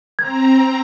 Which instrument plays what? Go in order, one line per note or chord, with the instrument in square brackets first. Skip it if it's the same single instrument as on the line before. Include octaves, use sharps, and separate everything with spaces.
[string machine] C4 A#5 [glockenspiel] G#6